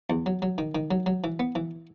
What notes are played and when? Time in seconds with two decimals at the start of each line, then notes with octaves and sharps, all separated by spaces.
0.10 E2
0.26 F#3
0.42 F#3
0.58 D#3
0.75 D#3
0.91 F#3
1.06 F#3
1.24 E3
1.40 B3
1.55 E3